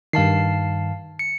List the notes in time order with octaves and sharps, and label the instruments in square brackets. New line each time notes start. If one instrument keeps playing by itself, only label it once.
[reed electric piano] G2 D#3 [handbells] F5 A5 C7
[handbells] C#7